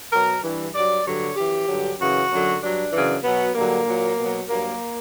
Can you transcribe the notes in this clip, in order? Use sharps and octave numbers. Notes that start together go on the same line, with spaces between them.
B2 F#3 A#4
G2 E3
G2 F#3 D5
G2 D3 F#3 C#5
F#2 E3 G4
G2 D3 F#3
F#2 C#3 E3 F#4
F#2 D3 F#3
G2 F#3 D4
F#2 C#3 E3
B2 F#3 B3
G2 D3 F#3 A#3
A#2 F#3
B2 F#3
G2 F#3 A#3